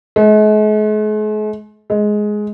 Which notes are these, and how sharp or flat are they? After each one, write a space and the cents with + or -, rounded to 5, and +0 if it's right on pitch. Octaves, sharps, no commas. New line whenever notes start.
G#3 +45
G#3 +10